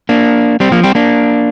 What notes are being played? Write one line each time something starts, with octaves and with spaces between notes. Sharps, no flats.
A#3 D4
G3 C4
F3 A#3
G3 C4
A#3 D4